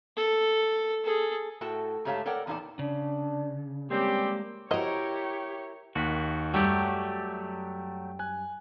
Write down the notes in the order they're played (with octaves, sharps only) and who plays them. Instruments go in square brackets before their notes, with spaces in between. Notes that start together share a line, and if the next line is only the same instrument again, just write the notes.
[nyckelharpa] A4
G#4 A4
[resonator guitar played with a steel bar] A2 F#4 A4 G5 A5
G#2 A3 G4 C#5 F5 A5
A4 A#4 C#5 D5 F#5 G5
E2 A#2 D#4 F4 D5 A5
[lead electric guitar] C#3 [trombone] D4
[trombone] G3 [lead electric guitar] G#3 A#3 [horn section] C4 C#4 G4
[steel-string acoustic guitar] E4 A#4 [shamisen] F#4 C5 D#5 [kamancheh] G4 [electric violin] C#5 C#6
[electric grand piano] D#2 D#3 B6 [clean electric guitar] F#4
[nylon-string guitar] F#2 G3 [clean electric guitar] F#3 A3 G4 [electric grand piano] G5
[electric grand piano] G#5 F#6